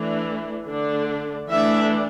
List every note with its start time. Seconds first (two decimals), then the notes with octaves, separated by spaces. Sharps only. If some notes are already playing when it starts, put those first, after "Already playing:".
Already playing: E3 A3 D4
0.67 D3 A3 D4
1.50 E3 A3 D4 E5